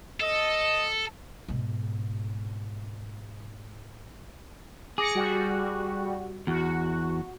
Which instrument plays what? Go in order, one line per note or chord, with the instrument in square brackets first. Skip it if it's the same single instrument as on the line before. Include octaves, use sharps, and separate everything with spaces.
[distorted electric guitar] A4 [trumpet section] D#5
[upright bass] G#2 B2
[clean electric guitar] G#4 [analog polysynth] D6 A#6 C#7
[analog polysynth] G3 F#4
[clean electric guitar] E2 [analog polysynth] F#4